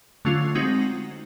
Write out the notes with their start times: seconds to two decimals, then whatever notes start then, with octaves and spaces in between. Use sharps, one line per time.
0.25 D3 F#3 A3 C#4 F4
0.55 G#3 C4 D#4 F#4